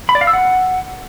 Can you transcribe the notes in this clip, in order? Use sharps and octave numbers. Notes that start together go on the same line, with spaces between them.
B5
D5
F5
E6
F#5